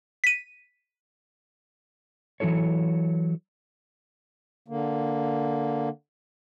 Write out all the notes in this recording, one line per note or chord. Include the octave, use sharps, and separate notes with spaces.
B6 D#7
E3 F#3 E4 A4 C#5
D3 A#3